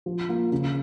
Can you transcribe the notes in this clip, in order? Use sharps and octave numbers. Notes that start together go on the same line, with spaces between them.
F3
A#3 F4
C#3